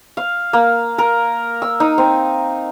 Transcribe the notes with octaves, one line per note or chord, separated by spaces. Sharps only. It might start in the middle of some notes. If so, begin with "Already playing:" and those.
F5
A#3
A#4
E6
D#4
C4